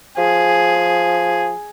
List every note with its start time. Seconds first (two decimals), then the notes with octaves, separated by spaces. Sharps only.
0.18 F3 G#4